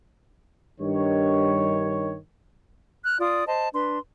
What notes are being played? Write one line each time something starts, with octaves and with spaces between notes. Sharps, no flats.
G2 D#3 C#5
F6 F#6
F4 D5 D#6
C5 D#5 A5
D4 B4 C6